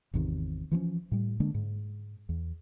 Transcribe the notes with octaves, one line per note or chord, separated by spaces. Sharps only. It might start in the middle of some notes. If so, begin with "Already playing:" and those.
G#1 E2 C3 D#3
E3 F3 B3 C#4
A2 G3
D3 G#3 A#3 D4
G#2
E2